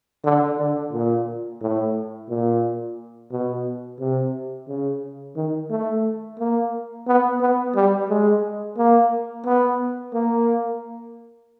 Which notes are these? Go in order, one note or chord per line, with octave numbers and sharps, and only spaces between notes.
D3
D3
A#2
A2
A#2
B2
C3
C#3
D#3
A3
A#3
B3
B3
G3
G#3
A#3
B3
A#3